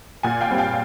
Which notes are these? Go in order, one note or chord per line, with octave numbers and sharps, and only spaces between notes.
A#2 F#5 G#5
F5 G5
G3 C4
F5 G5